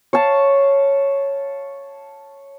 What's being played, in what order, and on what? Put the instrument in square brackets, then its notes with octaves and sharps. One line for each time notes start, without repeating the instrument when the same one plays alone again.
[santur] C#5 F5 A5